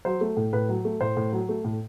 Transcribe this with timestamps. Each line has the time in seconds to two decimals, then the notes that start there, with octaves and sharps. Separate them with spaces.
0.05 F#3 C5
0.21 A3
0.37 A2
0.53 A2 B4
0.69 F#3
0.85 A3
1.01 A2 C5
1.17 A2
1.33 F#3
1.49 A3
1.64 A2